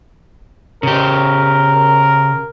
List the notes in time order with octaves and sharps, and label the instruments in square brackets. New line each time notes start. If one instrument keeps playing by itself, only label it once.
[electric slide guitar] C#3 G4 [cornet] A#4